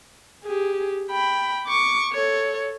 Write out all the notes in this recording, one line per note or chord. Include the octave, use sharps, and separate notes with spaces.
G4 G#4
G5 B5
C#6 D6
A4 C#5